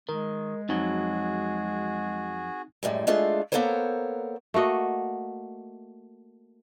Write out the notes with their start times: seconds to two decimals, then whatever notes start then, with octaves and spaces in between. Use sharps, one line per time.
0.09 D#3 G#3 A#4
0.69 F2 F#3 C4 D#4 F#4 G#4
2.83 F#2 A2 G3 G#3
3.07 G#3 A3 D4 F4 G#4 A4
3.52 A#3 B3 A4 A#4 C5 C#5
4.54 A3 A#3 F#4 D#5